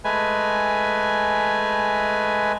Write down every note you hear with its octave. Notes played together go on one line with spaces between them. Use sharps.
G#3 A3 B4 G#5